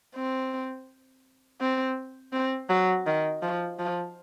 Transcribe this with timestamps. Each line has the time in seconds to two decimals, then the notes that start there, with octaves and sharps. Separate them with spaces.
0.15 C4
1.61 C4
2.33 C4
2.69 F#3
3.06 D#3
3.42 F3
3.79 F3